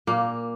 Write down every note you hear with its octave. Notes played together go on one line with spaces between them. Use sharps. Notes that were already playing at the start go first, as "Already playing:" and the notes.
A#2 A#3